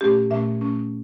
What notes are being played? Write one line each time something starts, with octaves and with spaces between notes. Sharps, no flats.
A#2 A3 C#4 G4
A#2 A3 C#4 E5
A#2 A3 C#4